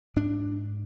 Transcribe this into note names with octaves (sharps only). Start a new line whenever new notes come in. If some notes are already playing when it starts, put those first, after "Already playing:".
G#2 D4